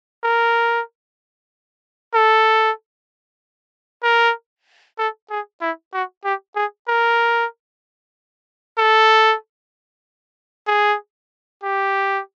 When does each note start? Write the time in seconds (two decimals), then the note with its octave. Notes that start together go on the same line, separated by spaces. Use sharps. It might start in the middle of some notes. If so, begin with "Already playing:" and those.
0.24 A#4
2.14 A4
4.03 A#4
4.99 A4
5.31 G#4
5.61 E4
5.94 F#4
6.25 G4
6.56 G#4
6.88 A#4
8.78 A4
10.67 G#4
11.63 G4